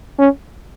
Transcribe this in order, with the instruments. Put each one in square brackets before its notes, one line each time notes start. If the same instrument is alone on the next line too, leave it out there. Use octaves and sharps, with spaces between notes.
[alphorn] C#4